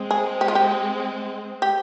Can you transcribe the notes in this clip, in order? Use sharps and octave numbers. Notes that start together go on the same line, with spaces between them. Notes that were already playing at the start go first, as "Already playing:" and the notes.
Already playing: G#3 C4
G#4
G4
F4
G4
G4